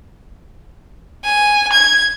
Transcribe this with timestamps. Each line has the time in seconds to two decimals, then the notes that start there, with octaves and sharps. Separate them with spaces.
1.25 G#5
1.73 G#6